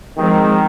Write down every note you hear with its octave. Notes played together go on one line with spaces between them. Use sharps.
D#3 F3 G#3 C4